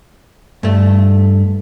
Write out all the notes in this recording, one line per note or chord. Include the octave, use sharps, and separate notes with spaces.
G2 A3